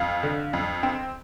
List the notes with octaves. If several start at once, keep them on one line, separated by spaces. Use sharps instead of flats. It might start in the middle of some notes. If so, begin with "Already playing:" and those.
Already playing: F2 F5
D3
F2
C4